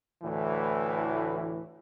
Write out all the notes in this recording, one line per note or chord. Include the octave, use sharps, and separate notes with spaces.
D2 A2 E3